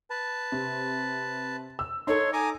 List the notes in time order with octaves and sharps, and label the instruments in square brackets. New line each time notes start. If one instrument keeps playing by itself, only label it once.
[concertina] B4 A5
[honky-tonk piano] C3
E6
[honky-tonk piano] D#4 A4 [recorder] C#5 [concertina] C6
[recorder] G#5 [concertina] A#5 D6 D#6